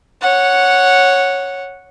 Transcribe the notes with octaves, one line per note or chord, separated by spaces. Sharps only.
C#5 F#5